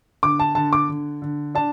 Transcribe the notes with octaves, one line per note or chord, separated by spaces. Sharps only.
D3 D6
A5
D3 A5
D6
D3
D3
D4 A5